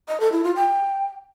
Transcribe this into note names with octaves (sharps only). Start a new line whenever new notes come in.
D#5
A4
E4
F4
G5